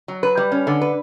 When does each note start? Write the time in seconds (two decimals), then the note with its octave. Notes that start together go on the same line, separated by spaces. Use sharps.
0.08 F#3
0.23 B4
0.37 G3
0.52 C#4
0.67 D3
0.81 B4